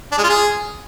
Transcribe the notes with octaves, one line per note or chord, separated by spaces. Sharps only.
D4
G#3
F4
G#4